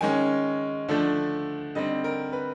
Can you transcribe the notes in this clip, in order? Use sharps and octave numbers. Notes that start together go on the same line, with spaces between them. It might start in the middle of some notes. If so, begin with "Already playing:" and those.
D#3 G#3 C#4 G#5
D3 F3 A3 D4
D3 G3 C4 D#4 D#5
A#4
B4